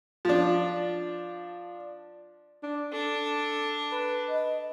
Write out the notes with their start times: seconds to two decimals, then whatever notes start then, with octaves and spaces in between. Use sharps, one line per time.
0.25 F3 D4
2.63 D4
2.93 D4 A4
3.92 B4
4.29 D#5